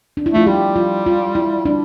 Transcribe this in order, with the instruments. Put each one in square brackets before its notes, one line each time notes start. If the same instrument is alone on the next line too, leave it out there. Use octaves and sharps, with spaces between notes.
[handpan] D4
E4
[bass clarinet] A3 [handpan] F4
[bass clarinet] G3 [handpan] G4
[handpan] F4
F4
E4
[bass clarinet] G3 [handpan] D4